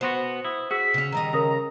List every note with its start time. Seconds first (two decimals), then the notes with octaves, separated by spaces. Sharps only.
0.01 B2 B3 F#4 C5
0.45 E4 D#6
0.71 F#4 G#4 E6 B6
0.94 C#3 C#4
1.13 D#3 G3 D#5 A#5
1.33 C#3 A#4 D#6 A#6